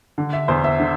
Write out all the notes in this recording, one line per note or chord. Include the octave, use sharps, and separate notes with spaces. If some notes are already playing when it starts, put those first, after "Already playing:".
D3
E5
E2 C5
E5
D3